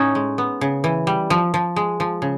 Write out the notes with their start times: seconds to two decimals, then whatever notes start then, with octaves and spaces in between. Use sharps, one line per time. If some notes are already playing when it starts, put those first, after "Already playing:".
Already playing: A2 C#4 D#4
0.15 G#3
0.38 B3
0.61 C#3
0.84 E3
1.07 G3
1.30 F3
1.54 F3
1.76 G#3
2.00 F3
2.22 C#3